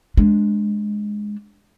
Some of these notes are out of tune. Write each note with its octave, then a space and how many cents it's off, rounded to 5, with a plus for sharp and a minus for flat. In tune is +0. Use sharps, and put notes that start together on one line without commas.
G#3 +0 D4 +0